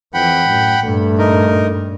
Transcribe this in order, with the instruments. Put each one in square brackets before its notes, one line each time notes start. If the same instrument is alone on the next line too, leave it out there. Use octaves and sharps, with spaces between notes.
[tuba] F2 [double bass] E3 [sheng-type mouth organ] F#5 G5 B5
[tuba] F#2 [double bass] A2
[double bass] G2 A#2 [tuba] A3
[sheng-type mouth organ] D#4 A#4